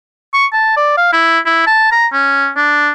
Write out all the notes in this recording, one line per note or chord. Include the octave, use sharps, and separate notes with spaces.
C#6
A5
D5
F5
E4
E4
A5
A#5
C#4
D4